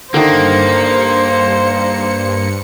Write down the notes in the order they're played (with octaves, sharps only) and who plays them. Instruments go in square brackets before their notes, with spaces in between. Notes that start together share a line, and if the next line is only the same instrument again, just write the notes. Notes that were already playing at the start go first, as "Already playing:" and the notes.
[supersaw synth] G2 C#7 [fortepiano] D3 D#3 [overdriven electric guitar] A#3 [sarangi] C5